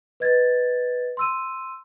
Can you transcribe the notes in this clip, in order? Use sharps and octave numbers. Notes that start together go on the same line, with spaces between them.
B4 D#5 G#6 A6
C6 E6 D#7